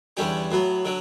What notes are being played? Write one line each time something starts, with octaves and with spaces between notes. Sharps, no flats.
E2 D3 G3 C#4 G4
A2 F#3 B3
D3 F#3